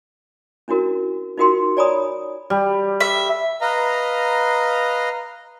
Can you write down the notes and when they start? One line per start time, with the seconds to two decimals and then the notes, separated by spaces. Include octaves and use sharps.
0.68 C#4 D4 E4 F#4 A#4
1.38 D#4 F4 F#4 A#4 G5 C6
1.77 C#5 D5 G#5 A#5 B5 D#6
2.50 G3
3.00 E5
3.61 B4 D#5 F5 A#5